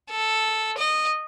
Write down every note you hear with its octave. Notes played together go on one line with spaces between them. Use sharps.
A4
D#5